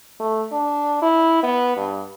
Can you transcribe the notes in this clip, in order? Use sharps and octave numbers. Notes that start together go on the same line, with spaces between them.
A3
D4
E4
B3
G2